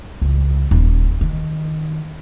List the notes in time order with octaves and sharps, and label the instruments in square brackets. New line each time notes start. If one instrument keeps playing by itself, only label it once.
[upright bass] C#2
D#1
D#3